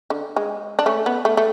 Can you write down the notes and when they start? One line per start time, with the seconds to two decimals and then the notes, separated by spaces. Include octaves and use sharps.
0.10 D3
0.36 G#3
0.79 D4
0.86 A3 C#4
1.06 B3
1.25 A3
1.37 A3